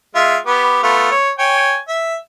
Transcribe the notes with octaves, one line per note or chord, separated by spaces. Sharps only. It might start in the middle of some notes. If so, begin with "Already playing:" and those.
G#3 F4 E5
B3 G4
A3 B3 F4
C#5
C#5 G5 G#5
E5